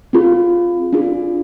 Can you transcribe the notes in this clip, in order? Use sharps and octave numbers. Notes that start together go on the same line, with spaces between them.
C4 F4 G#4
D4 F4 G#4